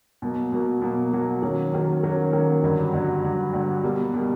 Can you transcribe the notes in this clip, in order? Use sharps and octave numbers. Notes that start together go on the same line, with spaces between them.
B2 F#3 A#3
B2 F#3 A#3
B2 F#3 A#3
B2 F#3 A#3
D#3 F#3 A#3 C#4
D#3 F#3 A#3 C#4
D#3 F#3 A#3 C#4
D#3 F#3 A#3 C#4
G2 D3 F#3
G2 D3 F#3
G2 D3 F#3
G2 D3 F#3
B2 G3 A#3
B2 G3 A#3